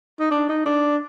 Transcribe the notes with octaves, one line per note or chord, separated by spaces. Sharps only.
D#4
D4
D#4
D4